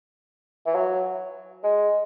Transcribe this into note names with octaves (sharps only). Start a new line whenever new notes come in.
E3
F#3
G#3